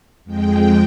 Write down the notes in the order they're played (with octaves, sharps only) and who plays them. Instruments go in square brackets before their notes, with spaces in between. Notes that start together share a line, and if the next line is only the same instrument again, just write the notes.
[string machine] F2 G#3 G5